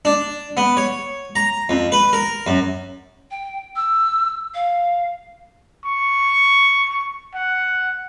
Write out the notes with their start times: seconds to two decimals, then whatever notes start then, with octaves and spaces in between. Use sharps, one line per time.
0.05 D4
0.57 B3
0.77 C#5
1.36 A#5
1.69 F2
1.92 B4
2.13 A#4
2.47 F#2
3.31 G5
3.76 E6
4.54 F5
5.84 C#6
7.34 F#5